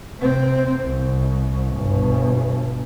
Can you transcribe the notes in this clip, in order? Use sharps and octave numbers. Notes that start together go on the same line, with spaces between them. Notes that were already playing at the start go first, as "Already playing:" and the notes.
C3 C4
C2
G1 B2